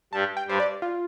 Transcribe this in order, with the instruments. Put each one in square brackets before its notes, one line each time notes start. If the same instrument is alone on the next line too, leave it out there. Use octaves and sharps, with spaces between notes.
[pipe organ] G2 G3 [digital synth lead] A5
[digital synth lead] G5
[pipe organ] G2 G3 [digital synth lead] C5
[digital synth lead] D5
F4